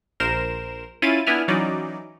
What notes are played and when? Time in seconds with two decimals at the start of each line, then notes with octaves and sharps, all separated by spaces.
0.20 A#1 A#4 C5 E7
1.02 C#4 E4 F4 A6 D#7
1.26 B3 D4 E4 G#5 F6
1.48 E3 F#3 C#4 D#4 D5